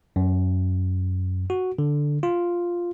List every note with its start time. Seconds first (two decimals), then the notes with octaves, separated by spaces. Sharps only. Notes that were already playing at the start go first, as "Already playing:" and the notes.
0.16 F#2
1.50 F#4
1.79 D3
2.23 F4